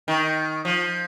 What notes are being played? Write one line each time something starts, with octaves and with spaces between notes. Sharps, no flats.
D#3
F3